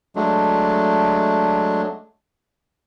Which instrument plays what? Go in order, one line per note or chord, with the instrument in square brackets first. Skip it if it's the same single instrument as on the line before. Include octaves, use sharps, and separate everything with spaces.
[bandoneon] F#3 G#3 A3 D4